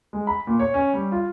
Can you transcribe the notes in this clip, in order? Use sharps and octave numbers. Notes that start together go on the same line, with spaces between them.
G#3
B5
A#2
C#5
C#4
G3
F4